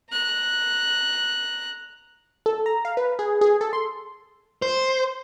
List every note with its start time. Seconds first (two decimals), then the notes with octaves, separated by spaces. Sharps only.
0.10 A#5 F#6
2.46 A4
2.66 A#5
2.85 F5
2.97 B4
3.19 G#4
3.41 G#4
3.61 A4
3.73 C6
4.62 C5